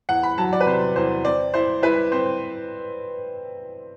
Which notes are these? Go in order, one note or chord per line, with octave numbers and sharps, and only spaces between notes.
E2 F#5
B5
F#3 A5
D5
B4
C3 C5
E2 C5
C4 D5
E4 C5
E4 B4
C4 C5